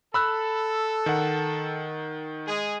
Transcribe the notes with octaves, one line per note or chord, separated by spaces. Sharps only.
A4 B5 E6 F#6
D#3 F#5
G#3 G#4